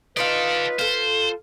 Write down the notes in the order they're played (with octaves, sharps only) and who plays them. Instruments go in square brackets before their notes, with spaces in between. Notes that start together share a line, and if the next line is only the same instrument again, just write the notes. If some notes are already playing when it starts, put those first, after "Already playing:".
[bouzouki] D#4 F4 F5 [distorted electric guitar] A4 D5 [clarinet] B4
[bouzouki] F4 A4 [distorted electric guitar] C5